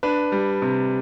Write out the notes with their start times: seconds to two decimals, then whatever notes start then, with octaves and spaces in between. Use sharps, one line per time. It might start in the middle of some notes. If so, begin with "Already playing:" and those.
0.03 D4 B4
0.32 G3
0.62 C3